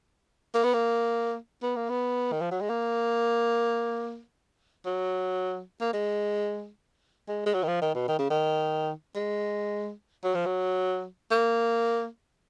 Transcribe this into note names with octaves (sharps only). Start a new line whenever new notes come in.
A#3
B3
A#3
B3
A#3
B3
D#3
F3
F#3
G#3
A#3
F#3
A#3
G#3
G#3
G#3
F#3
D#3
F3
D#3
B2
D#3
C#3
D#3
G#3
F#3
F3
F#3
A#3